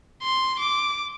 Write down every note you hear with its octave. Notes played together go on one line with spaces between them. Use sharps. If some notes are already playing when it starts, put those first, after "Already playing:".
C6
D6